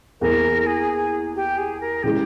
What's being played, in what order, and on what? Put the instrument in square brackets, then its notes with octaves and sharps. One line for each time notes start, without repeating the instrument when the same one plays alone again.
[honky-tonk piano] E2 E3 A#3 [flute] A#4
[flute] G#4
G4
G#4
A#4
[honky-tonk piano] C#3 E3 G#3 [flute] G4